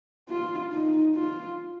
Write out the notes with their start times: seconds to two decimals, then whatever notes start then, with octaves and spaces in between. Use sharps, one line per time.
0.29 F4
0.72 D#4
1.15 F4